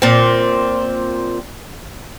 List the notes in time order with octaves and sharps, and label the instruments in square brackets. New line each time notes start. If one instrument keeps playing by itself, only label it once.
[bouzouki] A#2 C4